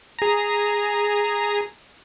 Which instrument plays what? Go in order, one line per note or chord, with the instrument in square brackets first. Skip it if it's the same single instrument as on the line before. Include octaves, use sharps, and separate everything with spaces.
[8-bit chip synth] G#4 A#5